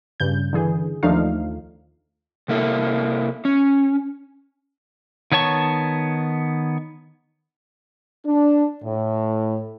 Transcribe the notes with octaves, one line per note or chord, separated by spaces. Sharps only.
G2 C#3 G6
D3 E3 G#4
D#2 F3 A3 D4 D#4 F5
C3 A#3 E4 A4
C#4
D#3 B3 C#5 A5 C#6
D4
A2